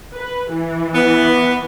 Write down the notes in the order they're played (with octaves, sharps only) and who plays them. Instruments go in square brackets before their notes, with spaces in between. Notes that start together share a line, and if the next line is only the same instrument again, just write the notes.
[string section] B4
E3
[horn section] B3